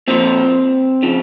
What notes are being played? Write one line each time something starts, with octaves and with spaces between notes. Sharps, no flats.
A#2 F3 C4
C#3 F3